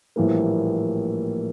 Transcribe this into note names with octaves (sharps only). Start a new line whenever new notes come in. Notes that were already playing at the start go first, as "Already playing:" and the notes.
A#1 A2 E3 G3 A#3